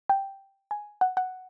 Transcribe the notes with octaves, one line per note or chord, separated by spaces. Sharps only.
G5
G#5
F#5
F#5